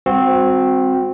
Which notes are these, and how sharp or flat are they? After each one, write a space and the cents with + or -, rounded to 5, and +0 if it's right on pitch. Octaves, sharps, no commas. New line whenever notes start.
G3 +45 C4 +0 F#4 -25